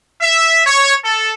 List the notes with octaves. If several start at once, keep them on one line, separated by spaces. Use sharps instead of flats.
E5
C#5
A4